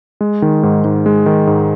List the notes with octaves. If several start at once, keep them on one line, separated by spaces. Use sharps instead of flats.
G#3
D#3
G#2
G#2
G#3
D#3
G#2